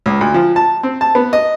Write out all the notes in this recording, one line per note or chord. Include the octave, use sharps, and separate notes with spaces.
C#2
D2
F3
A5
C4
A5
B3
D#5